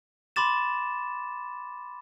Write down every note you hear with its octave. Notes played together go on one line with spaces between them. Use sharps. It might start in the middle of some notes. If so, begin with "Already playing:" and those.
B5 C6 D6 A6 E7